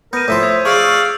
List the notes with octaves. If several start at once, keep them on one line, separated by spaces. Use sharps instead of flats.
B3 A#4 G6 D#7
A2 F3 E5 C6
D#6 G#6
G#4 D5 F5 C#6 E6